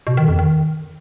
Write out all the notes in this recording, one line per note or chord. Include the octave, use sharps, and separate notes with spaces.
B2
D#3
F2
D#3